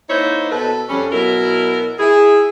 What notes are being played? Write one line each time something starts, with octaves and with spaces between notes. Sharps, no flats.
A#3 D#4 E4 C5 C#5
B2 A4 B4
F2 G3 C#4
B2 F#3 E4 A#4
E4 G#4